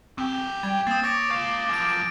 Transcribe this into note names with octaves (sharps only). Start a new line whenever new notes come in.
F#2 C4 G4
G3 G5 G#6
A#3 C4 D#6 A6
C#5 D6 A6 A#6 D7
G#3 F5
F#2 F3 G#6 D7